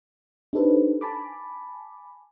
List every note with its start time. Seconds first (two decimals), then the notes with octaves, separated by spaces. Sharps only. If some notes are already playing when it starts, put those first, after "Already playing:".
0.53 D4 D#4 G4 A4 B4 C5
1.01 G#5 A5 B5 D6